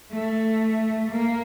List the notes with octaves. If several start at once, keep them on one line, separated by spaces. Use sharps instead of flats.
A3
A#3